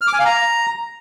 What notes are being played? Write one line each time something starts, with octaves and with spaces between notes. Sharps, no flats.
F6
D6
G#5
F5
A#5